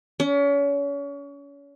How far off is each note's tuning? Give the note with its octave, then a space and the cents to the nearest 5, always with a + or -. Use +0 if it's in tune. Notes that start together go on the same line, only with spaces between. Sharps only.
C#4 +35